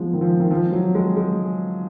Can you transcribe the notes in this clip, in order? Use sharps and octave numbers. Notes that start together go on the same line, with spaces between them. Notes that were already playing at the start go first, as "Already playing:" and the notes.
Already playing: F3 G#3 B3
D#3
F3
D#3
F3
F#3
G#3
G#3